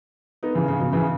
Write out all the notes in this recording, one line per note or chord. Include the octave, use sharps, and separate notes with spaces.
B3 D#4
C#3 E3
C#3
B2
C#3 E3